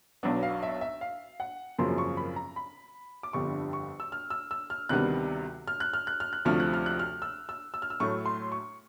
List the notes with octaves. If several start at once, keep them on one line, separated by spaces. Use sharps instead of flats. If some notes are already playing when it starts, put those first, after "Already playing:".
B1 B2 F#3 B3 D4
F5
E5
E5
F5
F#5
G#1 F#2 C#3 F3 A#3 C6
C#6
B5
A#5
B5
D6
G1 F2 D3 G3 C#6
C#6
E6
F6
E6
E6
F6
D2 C3 D#3 G3 B3 F#6
F6
F#6
F6
F#6
F6
F#6
D2 C3 F3 A3 F6
F#6
F6
F#6
F6
E6
E6
E6
F6
E6
A2 F#3 A3 C#6
C6
C#6